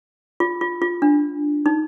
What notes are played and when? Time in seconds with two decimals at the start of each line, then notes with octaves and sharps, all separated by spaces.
0.40 F4
0.61 F4
0.82 F4
1.02 D4
1.66 D#4